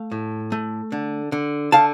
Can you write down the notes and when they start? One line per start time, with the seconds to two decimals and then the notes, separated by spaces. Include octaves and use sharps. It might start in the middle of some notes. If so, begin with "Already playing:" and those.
Already playing: A3 F5
0.11 A2
0.52 A3
0.92 D3
1.32 D3
1.72 D3 F5 A5